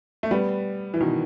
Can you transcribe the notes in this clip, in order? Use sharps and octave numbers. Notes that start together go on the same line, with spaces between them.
A3
G3 B3
E3
B2 D#3